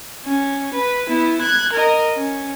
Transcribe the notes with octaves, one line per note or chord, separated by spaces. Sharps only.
C#4
B4
B3 E4
F#6 G#6
A#4 D#5
C#4